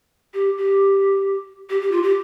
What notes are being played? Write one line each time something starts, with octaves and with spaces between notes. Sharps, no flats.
G4
G4
G4
G4
F4
G4